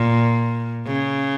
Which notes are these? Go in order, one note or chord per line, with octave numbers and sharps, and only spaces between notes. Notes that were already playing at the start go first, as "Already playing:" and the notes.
Already playing: A#2
C#3